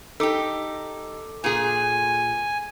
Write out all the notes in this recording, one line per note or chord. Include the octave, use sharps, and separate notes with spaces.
D#4 G4 A4 D6
A#2 G#4 G#5